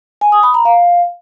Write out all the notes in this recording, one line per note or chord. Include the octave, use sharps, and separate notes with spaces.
G#5
D#6
B5
A#5
F5